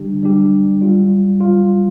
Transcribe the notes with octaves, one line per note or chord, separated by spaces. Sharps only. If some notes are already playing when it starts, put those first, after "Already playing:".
Already playing: D3 G3 D4 G4
D3 G3 D4 G4
G3 F4
G3 F4